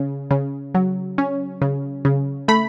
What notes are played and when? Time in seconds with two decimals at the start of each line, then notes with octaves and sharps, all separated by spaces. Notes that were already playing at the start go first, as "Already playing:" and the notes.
Already playing: C#3
0.31 C#3
0.75 F#3
1.18 C#4
1.62 C#3
2.05 C#3
2.48 A3 B5